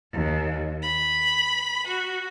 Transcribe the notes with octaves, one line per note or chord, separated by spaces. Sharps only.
D#2
B5
F#4